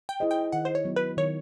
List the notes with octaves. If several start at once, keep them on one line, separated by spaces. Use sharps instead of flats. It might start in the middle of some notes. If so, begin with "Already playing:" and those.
G5
E4 G#4 C5 D#5
G5
D#3 F#5
C5
C#5
F#3 B3
B4
D#3 C#5